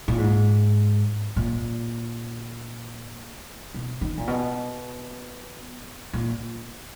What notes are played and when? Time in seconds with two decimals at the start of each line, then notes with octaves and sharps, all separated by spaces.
0.08 A#2
0.18 G#2
1.36 A#2
3.74 B2
4.01 D#3
4.17 A#2
4.27 B2
6.13 A#2